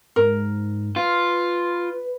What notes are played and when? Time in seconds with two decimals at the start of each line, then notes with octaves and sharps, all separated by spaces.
0.16 G#2 A#4
0.96 F4 B4